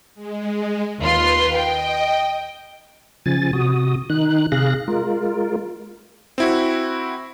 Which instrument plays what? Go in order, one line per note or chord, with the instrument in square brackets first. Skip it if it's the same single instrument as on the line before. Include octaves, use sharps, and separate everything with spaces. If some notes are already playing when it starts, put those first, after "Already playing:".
[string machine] G#3
[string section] D#2 F4 C6 [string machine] B4
[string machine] D#5 [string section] G5
[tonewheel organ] C#3 F3 G#5 A6
C3 F#4 D#6
D#3 D#4 F#6
C3 G#4 F5 F#6 A#6
G#3 F4 A#4
[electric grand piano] C4 E4 F#4